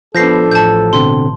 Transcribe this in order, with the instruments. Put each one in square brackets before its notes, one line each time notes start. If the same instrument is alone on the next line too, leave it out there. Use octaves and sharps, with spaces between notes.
[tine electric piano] F3 [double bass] B3 D4 [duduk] A4 [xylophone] G6 A#6 C7
[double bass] A1 [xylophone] A5 G6
[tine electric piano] B2 D3 C4 [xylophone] C6